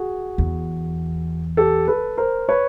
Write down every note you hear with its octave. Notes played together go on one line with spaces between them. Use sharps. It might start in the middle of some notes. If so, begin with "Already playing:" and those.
Already playing: F#4 G#4
E2
G4 A4
A4 B4
A#4 C5
B4 C#5